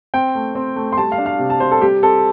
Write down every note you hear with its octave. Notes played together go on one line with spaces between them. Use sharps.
C4 G5
A3
C4
A3
C6
G3 A5
F5
D4
F5
C3
A5
C3 C5
A4
G3 G4
C4 A4